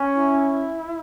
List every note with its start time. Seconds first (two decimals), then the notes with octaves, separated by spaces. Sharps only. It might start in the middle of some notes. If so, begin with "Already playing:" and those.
Already playing: C#4
0.15 E4